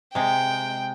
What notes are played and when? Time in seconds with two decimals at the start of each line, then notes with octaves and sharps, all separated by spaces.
0.15 C3 G#3 G5